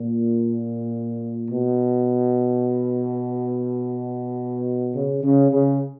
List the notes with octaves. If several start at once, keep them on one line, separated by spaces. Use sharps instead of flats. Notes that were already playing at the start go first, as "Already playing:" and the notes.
Already playing: A#2
B2
C#3
C#3
C#3